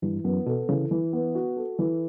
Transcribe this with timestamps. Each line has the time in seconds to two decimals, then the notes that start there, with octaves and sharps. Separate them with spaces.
0.02 G2 E3
0.24 F#2 B3
0.46 B2 A4
0.69 C#3 E3
0.91 E3
1.13 B3
1.35 F#4
1.57 A4
1.79 E3